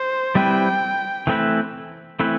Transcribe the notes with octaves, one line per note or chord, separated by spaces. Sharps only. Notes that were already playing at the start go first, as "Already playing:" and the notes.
Already playing: C5
G3 C4 E4 B4 G5
E3 A3 C4 E4 B4
E3 A3 C4 E4 B4